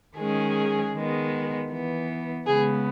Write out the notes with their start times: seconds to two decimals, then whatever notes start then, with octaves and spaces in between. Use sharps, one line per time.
0.18 D#3 G#3 C#4 G#4
0.95 D#3 G#3 B3
1.72 E3 B3
2.47 C#3 G#3 B3 G#4